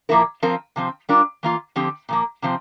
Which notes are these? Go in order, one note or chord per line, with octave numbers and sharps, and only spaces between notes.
A#2 F3 A#3 E4 A#4
F3 C4 F4 A#4
C3 F3 C4
G3 D4 F4 A#4
E3 A#3 F4
D3 F3 C4 G4
A#2 F3 A#3
C3 F3 C4